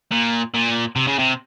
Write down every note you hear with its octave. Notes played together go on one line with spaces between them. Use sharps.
A#2
A#2
C3
C#3
C3